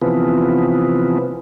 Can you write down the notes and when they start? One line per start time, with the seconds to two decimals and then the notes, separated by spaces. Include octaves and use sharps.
0.02 C3 E3 F3 B3